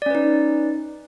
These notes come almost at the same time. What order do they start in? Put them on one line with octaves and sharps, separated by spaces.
D5 C#4 B4 D#4